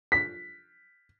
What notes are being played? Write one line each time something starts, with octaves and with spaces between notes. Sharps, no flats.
B6